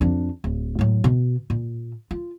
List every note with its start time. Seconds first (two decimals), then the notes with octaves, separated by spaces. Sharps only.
0.01 F2 D4
0.44 D1
0.79 A2 F#3
1.04 B2
1.50 A#2
2.11 F4